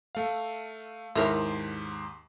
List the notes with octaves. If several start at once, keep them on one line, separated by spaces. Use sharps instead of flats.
A3 F5
D#2 G#2 E4 A#4 C#5